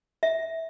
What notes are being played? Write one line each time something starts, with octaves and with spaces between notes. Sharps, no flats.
E5